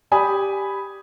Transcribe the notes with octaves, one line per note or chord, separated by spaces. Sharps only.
G4 D5 G#5 B5 D#6